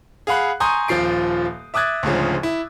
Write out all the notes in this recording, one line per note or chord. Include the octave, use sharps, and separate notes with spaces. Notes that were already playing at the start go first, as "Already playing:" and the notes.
G#4 F5 F#5 B5 F#6
G#5 A#5 C6 C#6 D#6 G6
D#1 F3 F4 C7 D7
E5 D6 D#6 F#6 G#6 A6
D2 G#2 C#3 F3
E4